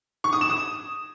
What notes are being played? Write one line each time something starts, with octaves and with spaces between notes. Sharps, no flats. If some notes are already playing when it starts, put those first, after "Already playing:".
C#6
D#6
E7
D#6